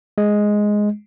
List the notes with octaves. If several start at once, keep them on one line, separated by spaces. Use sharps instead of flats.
G#3